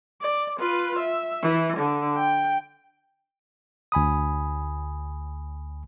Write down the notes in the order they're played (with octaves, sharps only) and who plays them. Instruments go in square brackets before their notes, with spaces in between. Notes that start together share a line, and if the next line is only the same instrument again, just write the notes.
[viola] D5
F4 B4
E5
E3
D3
G5
[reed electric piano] D2 G#5 B5 D#6